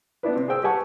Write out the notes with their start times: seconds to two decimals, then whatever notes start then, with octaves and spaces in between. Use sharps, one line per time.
0.23 B3 D4 E4 B4
0.36 C3
0.48 G#4 C5 G5 E6
0.63 G4 B4 F#5 G#5 A5 C#6